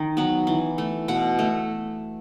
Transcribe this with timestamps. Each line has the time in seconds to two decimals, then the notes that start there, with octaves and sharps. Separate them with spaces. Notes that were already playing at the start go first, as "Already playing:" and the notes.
Already playing: D#3
0.17 F#3 B3
0.47 E3
0.78 A3
1.08 B2 F#5
1.39 A3